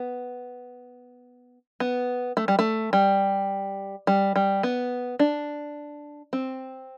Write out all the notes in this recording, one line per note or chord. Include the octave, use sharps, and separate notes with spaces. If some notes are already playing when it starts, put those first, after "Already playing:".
Already playing: B3
B3
A3
G3
A3
G3
G3
G3
B3
D4
C4